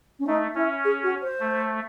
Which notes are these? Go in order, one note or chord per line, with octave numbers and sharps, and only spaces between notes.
C#4
A3 D#4
C#4 E4
G#4
F#4
C5
A3